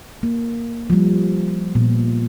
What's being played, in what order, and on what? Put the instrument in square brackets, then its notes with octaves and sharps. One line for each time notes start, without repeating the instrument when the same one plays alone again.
[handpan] A#3
F3 G3
A#2 B3